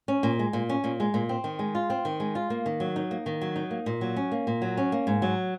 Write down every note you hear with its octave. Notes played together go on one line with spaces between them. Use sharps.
C#4
A#2
G#3
A#2
C#4
A#2
G#3
A#2
C4
D#3
G#3
F4
C4
D#3
G#3
F4
A#3
D#3
F#3
D#4
A#3
D#3
F#3
D#4
A#3
A#2
F#3
C#4
A#3
A#2
F#3
C#4
A#3
G#2
F#3